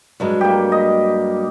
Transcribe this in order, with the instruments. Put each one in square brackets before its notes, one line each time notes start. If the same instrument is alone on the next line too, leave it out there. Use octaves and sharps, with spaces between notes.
[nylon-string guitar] G2 F#3 G#3
[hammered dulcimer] A#3 G4
D#5